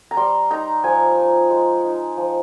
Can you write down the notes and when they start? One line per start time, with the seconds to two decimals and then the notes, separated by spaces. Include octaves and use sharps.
0.11 A#5
0.17 G3 C6
0.50 D#4 A#5
0.84 F3 G#5
1.17 F4
1.50 G#3
1.84 D#4
2.17 F3